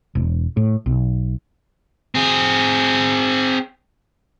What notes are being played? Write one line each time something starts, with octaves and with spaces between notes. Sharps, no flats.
E1
A2
B1
C4 G#4